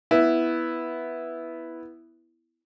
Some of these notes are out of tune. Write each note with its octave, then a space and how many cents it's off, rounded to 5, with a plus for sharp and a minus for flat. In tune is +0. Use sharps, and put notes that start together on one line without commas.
B3 +0 E4 +0